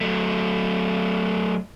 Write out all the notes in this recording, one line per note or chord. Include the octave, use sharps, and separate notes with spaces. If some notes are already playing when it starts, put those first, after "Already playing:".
F#3 A3